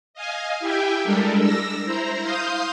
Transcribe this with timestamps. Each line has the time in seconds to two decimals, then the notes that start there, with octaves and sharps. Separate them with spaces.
0.14 D#5 F5 G#5
0.59 E4 G4 E5 G5 G#5
1.04 G3 G#3 D4 A4 A#4
1.39 E6 A#6
1.85 E4 C5 A#5
2.21 F5 C6 D#6 G6